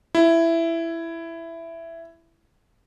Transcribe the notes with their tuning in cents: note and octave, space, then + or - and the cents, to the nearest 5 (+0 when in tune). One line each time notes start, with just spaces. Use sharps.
E4 +10